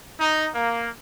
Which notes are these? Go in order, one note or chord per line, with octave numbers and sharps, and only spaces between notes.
D#4
A#3